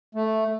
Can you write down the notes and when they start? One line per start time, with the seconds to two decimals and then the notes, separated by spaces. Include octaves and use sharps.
0.15 A3